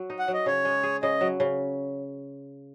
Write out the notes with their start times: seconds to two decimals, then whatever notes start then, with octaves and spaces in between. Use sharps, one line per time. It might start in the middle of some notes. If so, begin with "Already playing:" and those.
Already playing: F#3 F#4
0.10 D#4
0.19 F#5
0.28 F#3
0.33 D#5
0.46 C#3 C#5
0.65 G#3
0.83 G#4
1.03 C#3 D#5
1.21 F#3
1.40 C#3